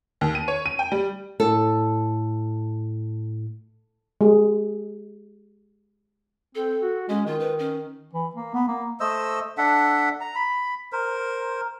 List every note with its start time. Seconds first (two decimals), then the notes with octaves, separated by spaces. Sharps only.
0.21 D#2
0.35 D#7
0.48 C#5
0.66 D#7
0.79 G5
0.92 G3
1.40 A2 A4
4.21 G#3 G4
6.55 C4 A4
6.82 F#4
7.09 G#3 C#4
7.26 D#3 F4
7.39 B4
7.59 C#4
8.13 E3
8.36 A#3
8.54 B3
8.68 A#3
9.00 A3 C5 D#5 E6
9.58 D4 A4 E5 F#5
10.21 A#5
10.35 B5
10.92 A#4 C5